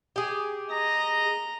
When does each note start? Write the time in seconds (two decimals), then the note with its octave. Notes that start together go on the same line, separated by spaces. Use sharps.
0.16 G4 G#4
0.70 D#5 A#5